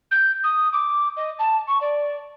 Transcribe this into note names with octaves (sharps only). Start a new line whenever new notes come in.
G6
D#6
D6
D#5
A5
C#6
D5